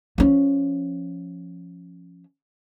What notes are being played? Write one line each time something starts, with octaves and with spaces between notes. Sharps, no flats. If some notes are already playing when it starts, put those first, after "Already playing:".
F3 C#4